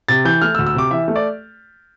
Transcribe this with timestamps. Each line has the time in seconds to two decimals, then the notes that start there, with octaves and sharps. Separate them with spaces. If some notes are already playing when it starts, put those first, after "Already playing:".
0.08 C3 A6
0.25 E3 G6
0.42 A3 F6
0.55 E6
0.59 D2
0.66 E6
0.75 C3 D6
0.91 E3 E5
1.08 A3
1.16 D5